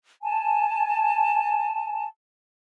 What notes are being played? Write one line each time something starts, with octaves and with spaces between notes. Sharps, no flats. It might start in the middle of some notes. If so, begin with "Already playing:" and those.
G#5 A5